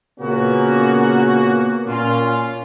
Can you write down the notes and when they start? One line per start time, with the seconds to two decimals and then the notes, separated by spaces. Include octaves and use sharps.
0.20 A#2 C#3 A#3 B3 C#4 F#4
1.87 A#2 C#4 F4